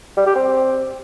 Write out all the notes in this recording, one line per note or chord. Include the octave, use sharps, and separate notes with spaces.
G3
G4
C4